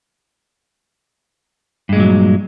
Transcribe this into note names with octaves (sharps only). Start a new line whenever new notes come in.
G2 A#2 F#3 G#3